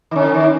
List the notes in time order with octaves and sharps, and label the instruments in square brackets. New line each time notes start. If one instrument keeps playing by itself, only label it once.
[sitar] D#3
[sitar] D3 [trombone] C#4
[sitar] D#3